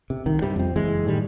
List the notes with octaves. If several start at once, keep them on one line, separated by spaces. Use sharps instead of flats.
C3
C2 D#3
G2 C3 G3
F2 C4
F#1 E3 G#3
A2 D#3 F3 G3